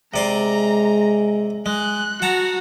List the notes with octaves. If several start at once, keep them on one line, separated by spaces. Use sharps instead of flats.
C3 G#3 D5 A#5 C6
G#3 F#6
F#4 F#5 A5 A#5